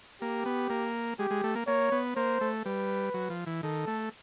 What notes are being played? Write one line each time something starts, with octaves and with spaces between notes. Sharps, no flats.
A#3 G4
B3
A#3
G#3 G4
G#3
A3
A#3
A#3 C#5
B3
A#3 C5
A3
G3 B4
F#3
F3
E3
D#3 A4
A3